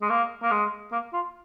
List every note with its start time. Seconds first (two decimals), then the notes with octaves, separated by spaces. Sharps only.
0.02 G#3
0.10 A#3
0.43 A#3
0.51 G#3
0.92 A#3
1.13 F4